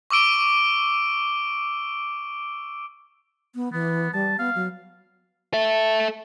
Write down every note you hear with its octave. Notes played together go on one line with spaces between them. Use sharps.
C#6 D6 E6 D7 G7
B3
E3 B3
G3 A5
B3 F5
F#3
A4 E5